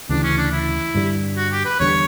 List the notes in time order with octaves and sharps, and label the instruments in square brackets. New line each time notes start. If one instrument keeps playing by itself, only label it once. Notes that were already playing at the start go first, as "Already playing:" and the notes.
[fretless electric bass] D2 C#3 E3 [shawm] D4
[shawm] C#4
D4
E4
[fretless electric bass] G2 D3 G3
[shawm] F#4
G4
B4
[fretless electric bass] E2 D3 G3 [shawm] C#5